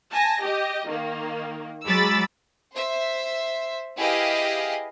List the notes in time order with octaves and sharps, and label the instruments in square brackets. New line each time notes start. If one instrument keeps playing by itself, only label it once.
[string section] G#5 A5 A#6
G4 D#5
D#3 A#3
F#3 G#3 B5 D6 E6 A6
[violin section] C5 E5
E4 G4 G#4 B4 D#5 F5